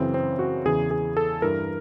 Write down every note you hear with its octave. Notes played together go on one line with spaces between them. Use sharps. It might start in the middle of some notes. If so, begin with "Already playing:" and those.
Already playing: F#2 C#3 E3 C4
C4
F#4
E2 C#3 E3 G#4
G#4
A4
G2 E3 A#4